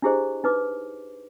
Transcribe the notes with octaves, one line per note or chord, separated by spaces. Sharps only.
D4 E4 G4 G#4 C5 D#5
D#4 B4 D6